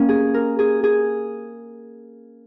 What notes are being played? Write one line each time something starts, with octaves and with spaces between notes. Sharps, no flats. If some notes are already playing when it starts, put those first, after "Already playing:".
Already playing: A#3 C#4
G#4
A#4
G#4
G#4